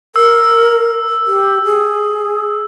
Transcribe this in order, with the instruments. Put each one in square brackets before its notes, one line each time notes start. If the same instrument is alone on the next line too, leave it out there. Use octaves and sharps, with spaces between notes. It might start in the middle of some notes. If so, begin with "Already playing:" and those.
[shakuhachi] A#4 [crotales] E6
[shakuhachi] G4
G#4